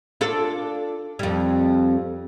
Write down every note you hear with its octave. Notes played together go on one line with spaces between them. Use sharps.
D4 F4 A4
F2 G3